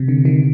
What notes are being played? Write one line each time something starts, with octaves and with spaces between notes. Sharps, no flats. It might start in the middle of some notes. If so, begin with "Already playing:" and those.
Already playing: C3
D3
D#3